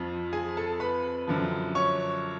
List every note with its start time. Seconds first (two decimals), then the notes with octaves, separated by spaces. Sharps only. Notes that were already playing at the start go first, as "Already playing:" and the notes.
Already playing: F2 F3 F4
0.33 G#4 G#5
0.57 A4 A5
0.80 B4 B5
1.27 F#2 D3 F3
1.75 C#5 C#6